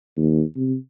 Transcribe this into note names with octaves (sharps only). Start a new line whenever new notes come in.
D#2
C3